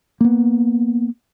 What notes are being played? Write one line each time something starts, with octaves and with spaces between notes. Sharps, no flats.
A#3 B3